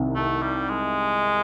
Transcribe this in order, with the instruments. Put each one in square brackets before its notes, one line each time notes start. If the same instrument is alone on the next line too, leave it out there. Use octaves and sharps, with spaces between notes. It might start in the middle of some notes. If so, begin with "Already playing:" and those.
Already playing: [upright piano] C2 C3 D#3
[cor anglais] A3
G3
G#3